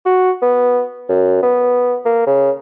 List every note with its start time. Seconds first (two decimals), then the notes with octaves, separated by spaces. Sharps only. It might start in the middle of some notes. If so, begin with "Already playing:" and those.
0.06 F#4
0.42 B3
1.09 F#2
1.43 B3
2.05 A#3
2.27 C#3